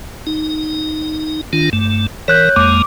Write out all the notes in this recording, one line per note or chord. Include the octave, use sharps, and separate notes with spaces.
D#4
D#3 D4 F4
G2 A3
E3 A#4 C#5 F#6 G6
F2 G#3 A#3 D6